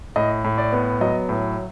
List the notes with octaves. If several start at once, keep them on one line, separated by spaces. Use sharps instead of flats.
A2 D#5
A2
D5
B3
F#3 D#5
A2